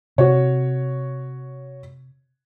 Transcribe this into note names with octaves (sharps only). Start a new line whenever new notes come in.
C3 F#4 C#5